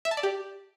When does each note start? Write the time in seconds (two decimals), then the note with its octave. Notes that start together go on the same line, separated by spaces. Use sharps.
0.05 E5
0.11 A5
0.17 D5
0.23 G4